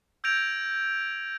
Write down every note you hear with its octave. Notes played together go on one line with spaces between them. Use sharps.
E6 G6 G#6 A#6 D7 F7